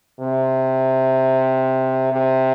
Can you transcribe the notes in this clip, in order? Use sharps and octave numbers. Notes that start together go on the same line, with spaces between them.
C3
C3